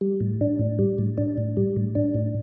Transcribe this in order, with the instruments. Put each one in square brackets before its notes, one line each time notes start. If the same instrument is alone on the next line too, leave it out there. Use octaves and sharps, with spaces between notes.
[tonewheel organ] G3
A2
D4
A2
G3
A2
D4
A2
G3
A2
D4
A2